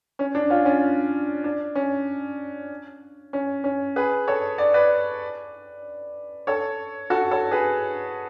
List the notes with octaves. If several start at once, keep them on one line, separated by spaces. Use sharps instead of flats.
C#4
D4
C#4 F4
C#4 F4
D4
C#4
C#4
C#4
G#4 B4
A4 C#5
D5
B4 D5
A4 C#5
F#4 A4
A4 C#5
G#4 B4